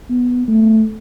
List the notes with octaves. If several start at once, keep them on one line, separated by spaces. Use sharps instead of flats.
B3
A3